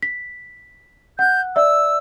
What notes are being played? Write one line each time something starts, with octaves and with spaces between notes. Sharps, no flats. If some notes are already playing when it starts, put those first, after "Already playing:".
B6
F#5 F#6 G6
D5 E5 E6